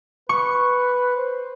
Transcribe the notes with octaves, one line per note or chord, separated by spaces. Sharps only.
B4 C#6
C5